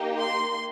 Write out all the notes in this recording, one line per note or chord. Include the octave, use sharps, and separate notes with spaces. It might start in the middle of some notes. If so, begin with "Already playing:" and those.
Already playing: A#3 D#4 G4
C6